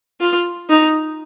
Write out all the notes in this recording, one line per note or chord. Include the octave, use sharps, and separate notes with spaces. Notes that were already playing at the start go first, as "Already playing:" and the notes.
F4
D#4